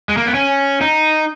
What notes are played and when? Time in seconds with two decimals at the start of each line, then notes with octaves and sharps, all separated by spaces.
0.09 G#3
0.17 A#3
0.26 B3
0.34 C#4
0.81 D#4